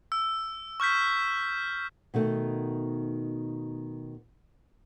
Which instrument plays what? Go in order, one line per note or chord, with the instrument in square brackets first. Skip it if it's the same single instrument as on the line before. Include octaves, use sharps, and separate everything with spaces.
[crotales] E6
C#6 F6 G6 B6
[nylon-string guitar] B2 D#3 A3